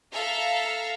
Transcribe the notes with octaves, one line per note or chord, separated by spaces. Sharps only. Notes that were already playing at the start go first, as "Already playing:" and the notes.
A4 E5 F5 A#5